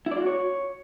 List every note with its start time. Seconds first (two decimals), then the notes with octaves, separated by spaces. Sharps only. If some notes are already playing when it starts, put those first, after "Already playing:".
0.06 E4
0.11 D5
0.17 F4
0.22 F#4
0.27 C#5